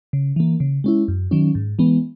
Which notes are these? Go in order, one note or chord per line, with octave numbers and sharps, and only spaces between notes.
C#3
E3 A#3
C#3
G#3 C#4 E4
F#2
D#3 F#3 C#4
G#2
E3 G#3 B3